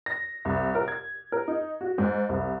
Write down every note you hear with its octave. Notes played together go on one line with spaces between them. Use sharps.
A#6
C2
A#4
G#6
A#4
D#4
F#4
G#2
C2